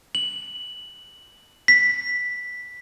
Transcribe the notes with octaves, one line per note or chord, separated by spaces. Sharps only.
F#7
B6